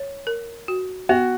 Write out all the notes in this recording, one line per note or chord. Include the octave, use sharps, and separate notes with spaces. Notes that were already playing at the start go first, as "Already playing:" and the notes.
Already playing: C#5
A#4
F#4
B3 F#4